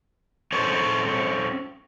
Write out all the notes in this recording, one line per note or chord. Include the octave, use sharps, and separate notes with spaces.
C4 C#4 A4 C5 C#5